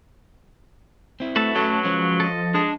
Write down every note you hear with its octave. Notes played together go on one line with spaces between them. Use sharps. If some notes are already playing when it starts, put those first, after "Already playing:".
C4 E4
A3 F#4 A4 B4 A5
F#3 C#4 A4
F3 G#3 C#4
A4 D#5
G#3 D4 A5